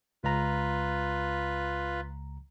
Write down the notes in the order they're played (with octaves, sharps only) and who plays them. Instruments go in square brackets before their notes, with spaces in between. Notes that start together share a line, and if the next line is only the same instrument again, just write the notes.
[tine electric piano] C#2 A#5 [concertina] F4 B4